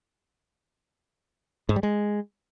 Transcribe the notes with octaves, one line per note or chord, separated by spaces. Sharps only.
G#2
G3
G#3